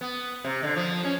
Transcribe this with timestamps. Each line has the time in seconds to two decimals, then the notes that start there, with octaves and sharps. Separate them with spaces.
0.01 B3
0.44 C3
0.63 D3
0.76 F3
1.04 C#4